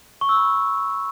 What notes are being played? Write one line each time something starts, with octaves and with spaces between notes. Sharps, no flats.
C#6
E6
B5